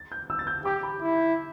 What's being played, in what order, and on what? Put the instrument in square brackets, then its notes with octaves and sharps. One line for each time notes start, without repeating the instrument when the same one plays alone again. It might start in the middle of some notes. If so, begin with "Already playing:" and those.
Already playing: [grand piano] A6
G6
E6
A6
G6
[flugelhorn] G4 [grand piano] D6
[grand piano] B5
[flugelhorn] E4